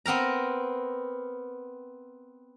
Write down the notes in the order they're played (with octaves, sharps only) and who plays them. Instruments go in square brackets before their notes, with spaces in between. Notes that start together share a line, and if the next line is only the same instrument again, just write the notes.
[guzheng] B3 C4 A#4 A#5